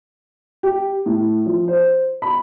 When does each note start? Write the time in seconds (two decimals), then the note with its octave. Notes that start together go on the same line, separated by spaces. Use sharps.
0.63 G4
1.06 A2
1.46 F3
1.68 C5
2.22 B5